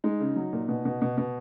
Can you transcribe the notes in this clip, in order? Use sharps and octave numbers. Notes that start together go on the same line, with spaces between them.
G#3 D#4
C#3
F#3
A#2
B2
B2
B2
B2